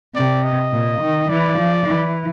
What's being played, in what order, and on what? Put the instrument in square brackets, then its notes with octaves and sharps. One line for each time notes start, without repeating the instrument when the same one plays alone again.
[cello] C3 [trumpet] D5
[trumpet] D#5
[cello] A#2
D#3
[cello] E3 [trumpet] D5
[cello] F3
E3